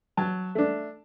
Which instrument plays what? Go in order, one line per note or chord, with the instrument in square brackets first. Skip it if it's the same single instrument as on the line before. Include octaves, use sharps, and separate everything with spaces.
[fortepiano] F#3 A5
A3 D4